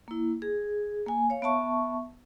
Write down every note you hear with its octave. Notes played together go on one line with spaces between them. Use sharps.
A#3 E4
G#4
A#3 G#5
C#5 F5
B3 E5 A5 C#6